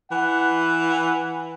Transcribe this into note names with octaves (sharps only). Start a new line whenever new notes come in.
E3 F#5